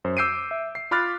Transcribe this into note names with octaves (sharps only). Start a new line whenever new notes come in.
F#2 C5
D6 E6 G6 C7 D7 D#7
E5
C7
F4 B5 D6 F6 F#6 A6